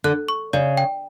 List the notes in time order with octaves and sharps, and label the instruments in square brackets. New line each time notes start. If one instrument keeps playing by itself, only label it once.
[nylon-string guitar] D3 [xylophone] F#6
[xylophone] C#6
[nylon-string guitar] C#3 [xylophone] D5
[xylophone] G5